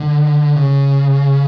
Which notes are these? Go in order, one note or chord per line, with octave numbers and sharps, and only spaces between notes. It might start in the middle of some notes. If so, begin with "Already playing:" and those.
Already playing: D3
C#3